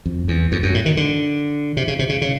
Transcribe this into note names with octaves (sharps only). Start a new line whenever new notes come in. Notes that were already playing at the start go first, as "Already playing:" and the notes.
F2
E2
F2
F#2
A2
D#3
D3
C3
C#3
C3
C#3
C#3